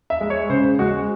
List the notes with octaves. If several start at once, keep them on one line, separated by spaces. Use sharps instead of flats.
E5
G#3
C#5
C#3 C5
G#3 F#4